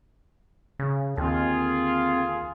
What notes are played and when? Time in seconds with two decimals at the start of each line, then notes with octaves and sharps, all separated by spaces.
0.79 C#3
1.17 D#2 D3 C4 F4 G#4